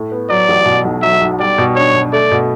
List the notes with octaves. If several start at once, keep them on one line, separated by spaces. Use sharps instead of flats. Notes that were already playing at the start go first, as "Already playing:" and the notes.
Already playing: A2
B3
F#3 D5
A1
B2
B1
F#3 E5
B1
G3 D5
B2
D4 C#5
B2
A3 D5
B2